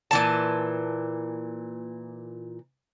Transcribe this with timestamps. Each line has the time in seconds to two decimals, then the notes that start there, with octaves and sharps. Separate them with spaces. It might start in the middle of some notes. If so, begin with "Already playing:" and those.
0.11 A#2 E3 A5